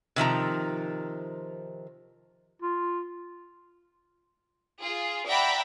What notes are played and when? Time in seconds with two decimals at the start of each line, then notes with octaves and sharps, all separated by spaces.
0.16 C3 D#3 F3 A#5
2.62 F4
4.79 F4 G#4
5.25 D5 E5 F#5 G5 A#5 B5